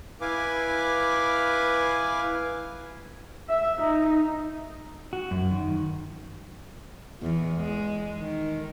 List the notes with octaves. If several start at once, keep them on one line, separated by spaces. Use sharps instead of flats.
E4 B4 F5 G#5 D6
E5
D#4
F#4
F#2
D#3
E2
G#3
D#3